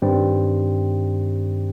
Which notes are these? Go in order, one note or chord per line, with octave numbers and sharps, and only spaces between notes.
G2 D#3 G3 C4